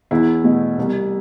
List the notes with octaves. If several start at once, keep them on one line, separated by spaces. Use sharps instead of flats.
E2 E4
B2 A3
C2